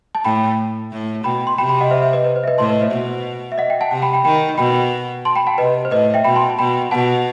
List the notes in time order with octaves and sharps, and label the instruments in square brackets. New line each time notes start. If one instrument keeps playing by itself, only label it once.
[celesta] A5
[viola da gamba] A2 [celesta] G5 B5
[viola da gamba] A2
[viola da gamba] B2 [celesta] G5 B5
[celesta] C6
[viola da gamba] C3 [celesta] G5 B5
[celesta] G5 B5
D#5 F#5
C5 E5
C5 E5
B4 D#5
B4
C5
E5
B4 D#5
[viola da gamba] A2 [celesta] A5 C6
[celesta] B4 D#5
C5 E5
[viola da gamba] B2
[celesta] E5
D#5 F#5
E5 G5
F#5 A5
[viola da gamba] C3 [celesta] F#5 A5
[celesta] G5 B5
G5 B5
[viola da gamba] D#3 [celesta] G5 B5
[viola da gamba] B2 [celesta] G5 B5
[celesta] A5 C6
G5 B5
F#5 A5
[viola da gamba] C3 [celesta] B4 D#5
[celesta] C5
[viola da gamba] A2 [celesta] B4 D#5
[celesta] E5 G5
[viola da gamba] B2 [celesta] G5 B5
[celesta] A5 C6
A5
[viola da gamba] B2 [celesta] G5 B5
[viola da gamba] B2 [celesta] F#5 A5